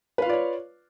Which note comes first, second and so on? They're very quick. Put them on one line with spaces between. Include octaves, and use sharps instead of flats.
B4 F5 F4 D5 C#5